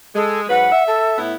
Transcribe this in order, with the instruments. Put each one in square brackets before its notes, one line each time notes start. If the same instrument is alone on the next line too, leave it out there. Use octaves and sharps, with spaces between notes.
[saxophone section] G#3 [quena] A4
[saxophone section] G#2 F#3 B4 [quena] F#5
[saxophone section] E5
[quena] A4
[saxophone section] A2 B3 E4